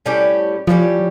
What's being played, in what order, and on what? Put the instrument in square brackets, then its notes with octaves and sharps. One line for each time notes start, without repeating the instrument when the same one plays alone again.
[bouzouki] A2 G3 C#4 G4
[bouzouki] A2 G3 C#4 G4 [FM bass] F3